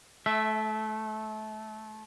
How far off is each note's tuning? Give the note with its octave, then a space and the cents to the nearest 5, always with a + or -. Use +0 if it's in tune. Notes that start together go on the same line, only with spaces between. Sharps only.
A3 -25 E5 +0